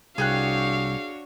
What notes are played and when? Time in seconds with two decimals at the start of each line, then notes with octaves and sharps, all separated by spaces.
0.18 C2 D4 F#4 G#4 C#5 F5 G5 F#6